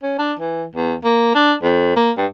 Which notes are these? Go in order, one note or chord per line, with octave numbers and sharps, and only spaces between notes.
C#4
D4
E3
E2
A#3
D4
F2
A#3
G2